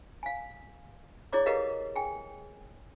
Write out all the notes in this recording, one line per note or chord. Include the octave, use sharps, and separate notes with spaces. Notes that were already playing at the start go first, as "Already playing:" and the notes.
F5 G#5
E4 G#4 C#5 D5 D6
G4 G#4 A#4 B4 D#5 F5
G#4 G5 G#5